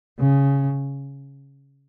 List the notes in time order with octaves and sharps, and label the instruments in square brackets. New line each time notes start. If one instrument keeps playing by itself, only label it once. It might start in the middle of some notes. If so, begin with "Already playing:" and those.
[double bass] C#3